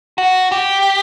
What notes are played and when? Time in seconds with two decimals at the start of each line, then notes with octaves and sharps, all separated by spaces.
0.18 F#4
0.52 G4